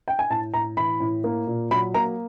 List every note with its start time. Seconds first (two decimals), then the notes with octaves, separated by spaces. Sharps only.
0.08 G5
0.19 G#5
0.30 A2 A5
0.54 A2 A#5
0.77 E3 B5
1.00 A2
1.24 A#3
1.47 A#2
1.71 F#3 B5
1.94 A#3 A#5